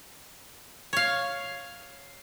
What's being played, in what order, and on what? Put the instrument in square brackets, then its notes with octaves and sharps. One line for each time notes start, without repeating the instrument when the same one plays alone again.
[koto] C#5 F5